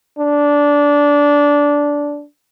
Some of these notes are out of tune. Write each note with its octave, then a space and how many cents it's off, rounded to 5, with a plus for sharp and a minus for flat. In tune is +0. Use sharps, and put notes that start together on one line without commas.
D4 -15